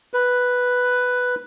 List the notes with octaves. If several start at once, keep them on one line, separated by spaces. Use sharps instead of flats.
B4